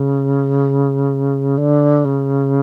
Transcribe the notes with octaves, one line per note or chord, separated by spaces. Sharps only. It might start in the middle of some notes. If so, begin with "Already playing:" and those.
Already playing: C#3
D3
C#3